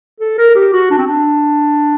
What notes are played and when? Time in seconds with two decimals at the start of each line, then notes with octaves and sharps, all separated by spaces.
0.20 A4
0.38 A#4
0.56 G4
0.73 F#4
0.91 D4
0.99 C4
1.07 D4